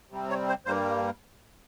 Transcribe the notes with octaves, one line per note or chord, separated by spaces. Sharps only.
C3 G3 C4
C#5
C5
G2 G3 A#3 C5